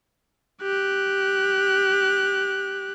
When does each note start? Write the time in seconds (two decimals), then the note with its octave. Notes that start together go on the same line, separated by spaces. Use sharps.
0.62 G4 F#6